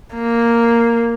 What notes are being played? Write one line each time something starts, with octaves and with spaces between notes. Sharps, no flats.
A#3